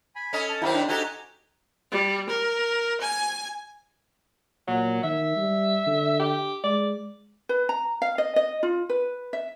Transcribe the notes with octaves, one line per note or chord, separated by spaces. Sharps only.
G#5 B5
C#4 A4 D#5
A5
F#2 D#3 C4 E4 G4 G5
D4
D#4 F#4 G4 A4 G#5 G6
G3
A#4
G#5
A#2 F#3
D#3 E5
G3
D3
G4
G#3 D5
B4
A#5
F5
D#5
D#5
F4
B4
E5